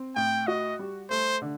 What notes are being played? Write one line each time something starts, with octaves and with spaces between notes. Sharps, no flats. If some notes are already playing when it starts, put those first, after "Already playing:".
Already playing: C4
A2 G5
F#4 D#5
G3
A3 C5
D3